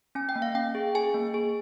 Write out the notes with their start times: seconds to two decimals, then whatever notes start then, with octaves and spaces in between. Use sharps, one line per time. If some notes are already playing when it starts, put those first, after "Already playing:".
0.15 C#4 G#5
0.29 G5
0.36 A#3
0.42 F5
0.55 C#4 G5
0.75 G#4
0.95 G#4 G#5
1.14 A#3
1.34 G#4